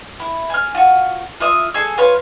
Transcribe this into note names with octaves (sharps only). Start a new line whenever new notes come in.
E4
G#5 F6
F4 F#4
F4 E5 D#6
G#4 A4 G#5 E6
F4 B4 C#5 B5